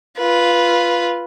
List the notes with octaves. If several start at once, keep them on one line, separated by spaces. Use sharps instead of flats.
F4 B4